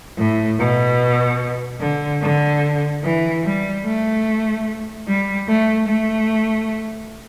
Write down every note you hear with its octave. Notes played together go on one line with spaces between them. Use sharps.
A2
B2
D3
D3
E3
G3
A3
G3
A3
A3